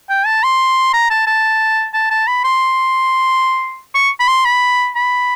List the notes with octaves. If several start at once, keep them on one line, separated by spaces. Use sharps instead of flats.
G5
A5
C6
A#5
A5
A5
A5
A5
B5
C6
C#6
B5
C6
B5
B5